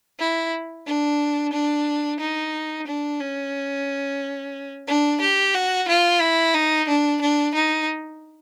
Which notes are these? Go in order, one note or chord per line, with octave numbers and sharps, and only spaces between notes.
E4
D4
D4
D#4
D4
C#4
D4
G4
F#4
F4
E4
D#4
D4
D4
D#4